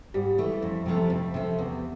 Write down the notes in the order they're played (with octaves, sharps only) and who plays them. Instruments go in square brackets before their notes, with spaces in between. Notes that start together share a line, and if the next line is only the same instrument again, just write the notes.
[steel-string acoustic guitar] G#2 [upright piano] G3
[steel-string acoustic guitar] E3 A3
F2
C3 F3 A3
F2
C3 F3 A3
E2